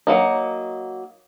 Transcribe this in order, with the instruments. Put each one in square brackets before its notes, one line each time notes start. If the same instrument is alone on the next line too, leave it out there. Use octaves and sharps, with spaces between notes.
[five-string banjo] F#3 A#3 D#4